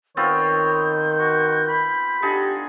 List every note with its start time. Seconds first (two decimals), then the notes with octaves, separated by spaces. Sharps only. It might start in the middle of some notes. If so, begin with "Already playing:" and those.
0.17 D#3 B3 C4 F4 C#5 G6
1.19 F#4
1.69 B5
2.22 D3 D#4 G4 G#4